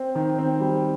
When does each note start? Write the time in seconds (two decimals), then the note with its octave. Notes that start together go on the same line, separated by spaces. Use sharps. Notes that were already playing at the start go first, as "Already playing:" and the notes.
Already playing: C4
0.15 D#3
0.38 C4
0.60 G3